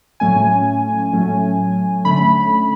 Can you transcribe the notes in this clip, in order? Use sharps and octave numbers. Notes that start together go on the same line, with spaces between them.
A2 F#3 A3 C#4 G#5
A2 F#3 A3 C#4
D3 A3 C#4 B5